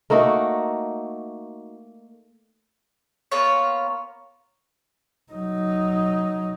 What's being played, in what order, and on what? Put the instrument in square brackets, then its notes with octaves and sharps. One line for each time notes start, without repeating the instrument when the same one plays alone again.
[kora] A3 A#3 D#4 F#4
[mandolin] A#3 B3 F4 C#5
[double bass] F#3 D#4